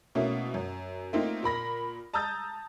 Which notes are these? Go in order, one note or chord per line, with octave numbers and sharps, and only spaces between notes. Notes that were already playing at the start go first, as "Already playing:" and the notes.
B2 A3 A#3 C#4 E4
F#2
A3 A#3 C4 D#4 F4
A#2 A#4 B5 A#6
A5 A#5 D#6 E6 G6 A6